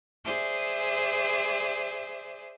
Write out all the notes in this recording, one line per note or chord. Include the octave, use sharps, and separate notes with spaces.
G#4 C5 D5 E5